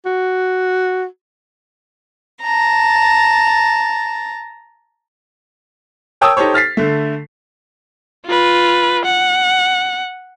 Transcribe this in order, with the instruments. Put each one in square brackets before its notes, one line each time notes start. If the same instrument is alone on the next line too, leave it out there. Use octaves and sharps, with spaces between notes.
[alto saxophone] F#4
[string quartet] A5 A#5
[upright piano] A#4 C#5 G5 A5 D#6 E6
D#4 G4 A4 C5 C#5
F6 A6 B6 C7
D3 A3
[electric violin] F4 B4
F#5